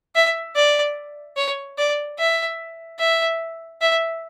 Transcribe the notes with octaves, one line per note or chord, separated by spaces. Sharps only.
E5
D5
C#5
D5
E5
E5
E5